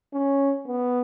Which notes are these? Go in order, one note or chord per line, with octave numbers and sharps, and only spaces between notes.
C#4
B3